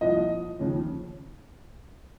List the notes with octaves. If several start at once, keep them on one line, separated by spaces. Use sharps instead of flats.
C2 A#2 F3 D#5
D#2 C#3 F3